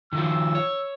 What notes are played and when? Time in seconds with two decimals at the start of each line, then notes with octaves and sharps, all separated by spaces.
0.13 D#3 F3 F4 E6
0.55 C#5